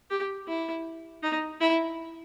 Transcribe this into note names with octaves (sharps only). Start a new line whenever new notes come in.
G4
E4
D#4
E4